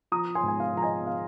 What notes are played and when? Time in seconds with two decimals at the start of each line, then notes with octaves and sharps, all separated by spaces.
0.12 F3 A#5 D#6
0.35 G#5 C6
0.43 G#2
0.48 G#5
0.60 F5
0.75 F3 A#5
0.82 D#5 G#5
1.07 F5